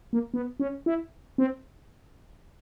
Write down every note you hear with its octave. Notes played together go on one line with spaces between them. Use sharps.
A#3
B3
C#4
E4
C4